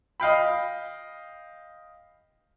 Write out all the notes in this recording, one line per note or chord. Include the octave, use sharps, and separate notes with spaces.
D#5 F5 G5 B5